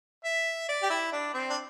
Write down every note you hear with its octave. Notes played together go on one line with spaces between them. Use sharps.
E5
D5
G4
E4
D4
C4
D4